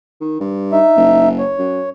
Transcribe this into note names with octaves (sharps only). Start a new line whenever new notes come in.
D#3
G2
D#4 E5
F#1
C#5
F#2